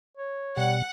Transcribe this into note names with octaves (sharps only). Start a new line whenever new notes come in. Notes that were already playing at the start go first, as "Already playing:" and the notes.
C#5
B2 G3 F#5